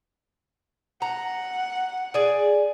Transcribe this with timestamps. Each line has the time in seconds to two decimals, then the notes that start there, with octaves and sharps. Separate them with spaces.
1.02 F#5 A#5
2.14 G#4 D5